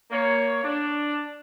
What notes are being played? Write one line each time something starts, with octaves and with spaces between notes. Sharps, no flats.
A#3 C#5
D4